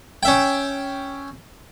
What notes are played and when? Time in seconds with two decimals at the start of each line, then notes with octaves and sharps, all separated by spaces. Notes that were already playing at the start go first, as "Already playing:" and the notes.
0.23 C#4 E5 G5